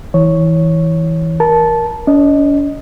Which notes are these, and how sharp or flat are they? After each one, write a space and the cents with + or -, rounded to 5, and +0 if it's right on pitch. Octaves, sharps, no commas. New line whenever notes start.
E3 -20 C#5 +0
A#4 +15 A5 -15
C#4 +45 D#5 +0